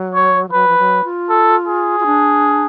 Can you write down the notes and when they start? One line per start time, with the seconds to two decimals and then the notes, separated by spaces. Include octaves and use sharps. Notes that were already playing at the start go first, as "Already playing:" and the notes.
Already playing: F#3
0.14 C#5
0.48 F3
0.53 F#3 B4
0.68 F3
0.79 F#3
1.04 F4
1.29 A4
1.67 G#4
2.00 F4
2.06 D4